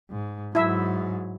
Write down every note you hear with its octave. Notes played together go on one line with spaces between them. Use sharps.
G#2
G#2 F#3 E4 E5